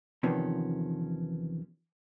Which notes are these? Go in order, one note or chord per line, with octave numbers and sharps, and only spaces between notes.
E2 C3 D#3 F3 B3 C#4